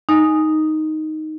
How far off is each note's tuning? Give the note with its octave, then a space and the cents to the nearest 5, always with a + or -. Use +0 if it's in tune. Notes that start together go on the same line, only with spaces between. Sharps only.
D#4 +0 G#5 +0